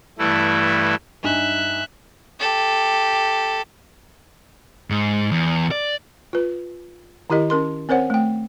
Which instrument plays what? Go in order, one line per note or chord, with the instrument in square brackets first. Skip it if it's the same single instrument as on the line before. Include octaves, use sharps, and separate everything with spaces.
[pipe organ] G2 E3 A3 E4
[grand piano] G2 D#4 G#5 [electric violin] E5 F#6
[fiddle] G4 A4
[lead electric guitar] G#2
E2
D5
[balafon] F4 B4
D#3 E4 G4 A#4 D#5
C#4 A#4 C6
C4 A#4 C5 C#5 F#5
A3 G5